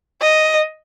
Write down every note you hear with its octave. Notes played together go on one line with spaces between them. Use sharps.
D#5